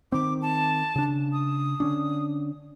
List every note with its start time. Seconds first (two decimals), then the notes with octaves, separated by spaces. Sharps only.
0.12 D#3 C4 D6
0.42 A5
0.96 C#3 D4
1.33 D#6
1.80 D3 C#4 D4